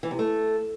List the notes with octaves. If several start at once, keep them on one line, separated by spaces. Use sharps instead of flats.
E3
C3
A3